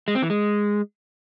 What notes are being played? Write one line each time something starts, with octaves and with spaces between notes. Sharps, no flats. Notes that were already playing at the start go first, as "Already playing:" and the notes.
G#3
C4
E3
G#3